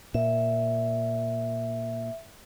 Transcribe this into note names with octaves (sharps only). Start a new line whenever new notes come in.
A#2 E5